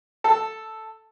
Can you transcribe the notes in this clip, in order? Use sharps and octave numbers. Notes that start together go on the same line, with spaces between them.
A4